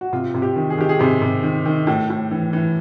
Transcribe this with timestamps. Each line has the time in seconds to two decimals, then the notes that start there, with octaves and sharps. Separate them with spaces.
0.01 F#4
0.13 C3 F4
0.34 C3
0.42 G4
0.56 D#3
0.70 G#4
0.78 D#3 G4
0.89 G#4
0.99 C3 G4
1.22 C3
1.43 D#3
1.66 D#3
1.87 A2
2.10 A2
2.31 E3
2.53 E3